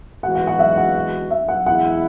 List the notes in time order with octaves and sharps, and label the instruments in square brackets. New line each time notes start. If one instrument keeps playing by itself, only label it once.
[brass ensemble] E3 G#3 B3 F#4 [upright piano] F#5
[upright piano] F#5
F#5
E5
F#5
E5
F#5
[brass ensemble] E2 E3 G#3 E4 G#4 [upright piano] F#5